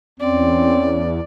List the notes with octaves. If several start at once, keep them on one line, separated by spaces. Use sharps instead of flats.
E2 C4 C#4 D5